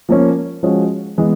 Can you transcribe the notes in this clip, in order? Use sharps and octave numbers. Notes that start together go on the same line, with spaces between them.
F3 A#3 C#4
F3 G#3 C#4 F#4
E3 G#3 B3